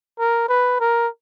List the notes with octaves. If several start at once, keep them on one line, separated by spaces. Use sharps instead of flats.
A#4
B4
A#4